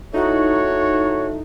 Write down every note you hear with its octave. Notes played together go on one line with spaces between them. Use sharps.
A3 D#4 E4 F#4 C#5